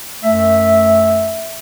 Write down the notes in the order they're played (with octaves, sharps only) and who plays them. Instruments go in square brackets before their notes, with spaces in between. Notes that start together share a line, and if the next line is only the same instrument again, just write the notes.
[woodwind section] F#2 A3 E5